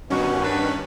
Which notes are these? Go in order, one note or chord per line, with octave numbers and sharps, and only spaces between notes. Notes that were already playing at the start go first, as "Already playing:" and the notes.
G2 B2 D#3 C#4 F#4
D4 F#4 B4